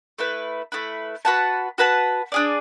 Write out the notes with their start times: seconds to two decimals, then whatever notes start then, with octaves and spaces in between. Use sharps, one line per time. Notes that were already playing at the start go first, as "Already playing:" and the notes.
0.19 A3 E4 B4
0.72 A3 E4 B4
1.25 F#4 B4 F#5 A5
1.78 F#4 B4 F#5 A5
2.32 D4 G#4 D5